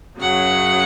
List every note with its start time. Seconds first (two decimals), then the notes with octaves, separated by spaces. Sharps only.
0.19 F#2 C#3 F#3 F#5